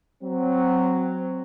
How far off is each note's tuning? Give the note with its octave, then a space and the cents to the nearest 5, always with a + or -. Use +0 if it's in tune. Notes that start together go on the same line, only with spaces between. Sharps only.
F#3 +0 C4 -10